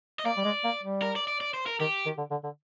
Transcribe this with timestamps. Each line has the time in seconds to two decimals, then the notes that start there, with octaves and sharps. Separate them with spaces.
0.19 D#5
0.25 A#3 D5
0.37 G3
0.45 G#3
0.64 A#3
0.83 G3
1.02 A#4
1.16 D5
1.28 D5
1.41 D5
1.54 C5
1.66 A#4
1.80 D#3 G4
2.06 D#3
2.18 D3
2.31 D3
2.44 D3